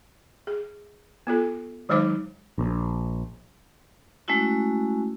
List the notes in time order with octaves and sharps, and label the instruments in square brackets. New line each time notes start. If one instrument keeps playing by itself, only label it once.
[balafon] G#4
B3 F4 A4
D#3 F#3 G#3 D#4 C5 D6
[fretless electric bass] A#1
[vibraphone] G#3 A3 C#4 E4 F#4